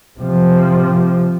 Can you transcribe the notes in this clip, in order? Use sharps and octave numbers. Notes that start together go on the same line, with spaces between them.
C3 F3